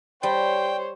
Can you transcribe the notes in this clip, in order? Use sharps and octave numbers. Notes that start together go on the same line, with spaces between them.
G3 C5 C#5 G5